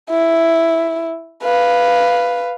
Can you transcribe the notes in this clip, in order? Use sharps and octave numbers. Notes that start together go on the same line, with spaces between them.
E4
B4 F5